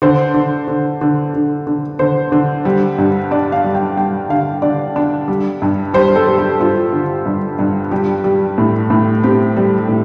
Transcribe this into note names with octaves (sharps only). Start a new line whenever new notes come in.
D3 C5
D3
D3
D3
D3
D3
D3 C5
D3
G3
G2
D4 D5
F5
G3
G5
G3 G5
D3 F5
D3 D5
D4
G3
G2
G3 C5
A4
G3
G4
G2 F4
D3
G2
G2
G3 G4
G3
A2
A2
C4 G4
G3
A2